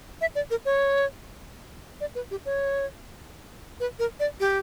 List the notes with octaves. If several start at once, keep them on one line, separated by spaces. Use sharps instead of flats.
E5
D5
A#4
C#5
D5
B4
G4
C#5
B4
A#4
D5
G4